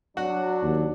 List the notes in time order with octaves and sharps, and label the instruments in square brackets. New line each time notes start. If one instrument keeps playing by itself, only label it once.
[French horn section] F#3 D4 [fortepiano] F#4 F#5
[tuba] D#2